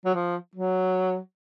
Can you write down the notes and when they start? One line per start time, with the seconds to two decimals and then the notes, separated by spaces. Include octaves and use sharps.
0.05 F#3
0.15 F3
0.55 F#3